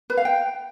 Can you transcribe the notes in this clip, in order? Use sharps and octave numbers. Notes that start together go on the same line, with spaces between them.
B4
F5
G5